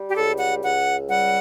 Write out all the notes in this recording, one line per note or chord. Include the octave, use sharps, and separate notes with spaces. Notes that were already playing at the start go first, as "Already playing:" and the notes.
Already playing: G3
G4
C#2 A4
F#5
C#2 F#5
G3 F#5